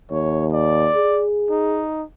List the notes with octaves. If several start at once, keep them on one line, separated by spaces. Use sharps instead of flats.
D#2 C#5
D5
G#4
D#4